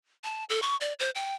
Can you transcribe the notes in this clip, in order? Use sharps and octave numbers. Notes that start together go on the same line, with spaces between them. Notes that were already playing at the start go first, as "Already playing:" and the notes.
A5
A4
C#6
D5
C5
G5